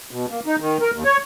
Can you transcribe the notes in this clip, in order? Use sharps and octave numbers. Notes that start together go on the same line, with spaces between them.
B2
A#3
D#4
D#3
A#4
D#2
C#5